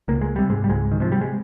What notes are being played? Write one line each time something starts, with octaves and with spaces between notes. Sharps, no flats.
C#2 A#3
G#3
C3 G3
G#2 G#3
G3
C#2 G#2 G#3
D#3
C3 F3
G3
G#3